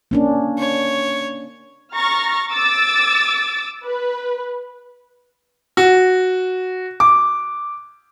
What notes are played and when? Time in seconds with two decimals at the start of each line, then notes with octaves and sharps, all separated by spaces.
0.11 A#3 C#4 D4
0.58 C#5
1.95 A#5 C#6 F6 A6 A#6
2.52 D6 E6 A6
3.85 B4
5.77 F#4
7.00 D6